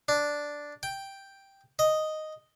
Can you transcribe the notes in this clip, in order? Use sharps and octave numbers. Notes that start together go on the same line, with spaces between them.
D4
G5
D#5